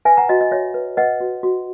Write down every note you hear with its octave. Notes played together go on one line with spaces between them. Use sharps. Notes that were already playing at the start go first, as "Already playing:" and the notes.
B4 E5 G#5
F#5 A#5
F#4 D#5
D#5
F#4 C#5 E5
B4
B4 D#5 F#5
F#4
F#4